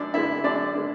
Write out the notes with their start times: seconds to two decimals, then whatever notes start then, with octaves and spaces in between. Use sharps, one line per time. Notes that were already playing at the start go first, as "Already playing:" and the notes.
Already playing: F#2 D4 D5
0.13 D3 G#3 E4 E5
0.44 F#2 D4 D5
0.75 D3 G#3